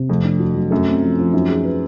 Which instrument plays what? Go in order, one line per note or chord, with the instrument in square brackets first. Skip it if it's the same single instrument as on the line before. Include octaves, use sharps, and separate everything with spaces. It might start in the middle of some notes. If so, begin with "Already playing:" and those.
Already playing: [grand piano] C3
[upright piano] F2 [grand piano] A3
[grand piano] D4
F#4
F#3
[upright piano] F#2 [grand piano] A3
[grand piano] C4
F3
F3
[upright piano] F#2 [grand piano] D#4
[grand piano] G#4
B4